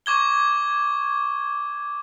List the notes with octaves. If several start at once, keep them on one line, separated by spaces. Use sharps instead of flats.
C#6 D6 G#6 G7